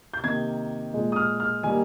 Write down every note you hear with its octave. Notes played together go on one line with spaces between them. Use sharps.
G6
C3 D#3 A#3 G#6
A#2 G#3
D#6
F6
F6
D#3 G3 A#3 G#5